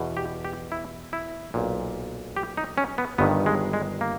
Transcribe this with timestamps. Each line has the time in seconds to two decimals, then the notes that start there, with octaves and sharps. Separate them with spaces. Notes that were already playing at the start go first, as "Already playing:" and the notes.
Already playing: E2 B2
0.17 G4
0.45 G4
0.72 E4
1.13 E4
1.54 B1 A#2
2.37 G4
2.57 D#4
2.78 C#4
2.98 B3
3.18 G1 G2 D#3 B3
3.46 G#3
3.73 G#3
4.01 A#3